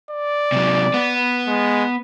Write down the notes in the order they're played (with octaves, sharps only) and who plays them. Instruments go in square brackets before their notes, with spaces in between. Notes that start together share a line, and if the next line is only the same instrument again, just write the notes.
[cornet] D5
[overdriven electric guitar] C3 F#3
B3
[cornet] G#3